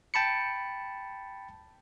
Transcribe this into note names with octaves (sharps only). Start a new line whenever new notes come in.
G5 A5 B5 C#7